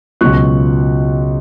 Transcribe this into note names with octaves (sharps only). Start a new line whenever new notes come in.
C#2 B2 F#3 C#6 F#6